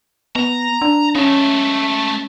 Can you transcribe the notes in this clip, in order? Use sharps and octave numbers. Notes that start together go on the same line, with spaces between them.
B3 A#5
D4
G#3 A3 C#4